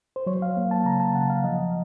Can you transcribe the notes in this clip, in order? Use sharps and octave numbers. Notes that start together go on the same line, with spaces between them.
C5
F#3 C#5
F5
A#3
A5
C#3 A#5
A5
C#3 F#5
F5
F3 D#5